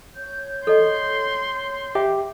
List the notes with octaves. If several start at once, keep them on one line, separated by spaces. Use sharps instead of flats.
C#5 G6
A4 D#5 C6
G4 E5